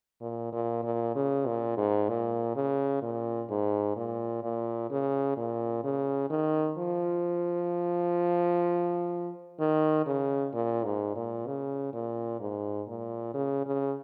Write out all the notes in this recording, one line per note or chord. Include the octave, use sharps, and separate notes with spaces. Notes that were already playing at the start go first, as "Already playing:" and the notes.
A#2
A#2
A#2
C#3
A#2
G#2
A#2
C#3
A#2
G#2
A#2
A#2
C#3
A#2
C#3
D#3
F3
D#3
C#3
A#2
G#2
A#2
C#3
A#2
G#2
A#2
C#3
C#3